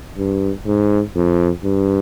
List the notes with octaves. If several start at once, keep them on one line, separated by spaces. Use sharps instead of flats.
G2
G#2
F2
G2